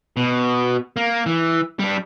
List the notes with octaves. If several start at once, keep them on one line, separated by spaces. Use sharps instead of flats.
B2
A#3
E3
G3 D4